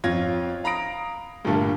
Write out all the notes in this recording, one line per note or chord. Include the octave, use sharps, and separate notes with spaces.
F2 C#4 F4 G#6 A#6
F5 A#5 B5 D#6 A#6 D7
G2 A#2 D3 G3 A3 A#3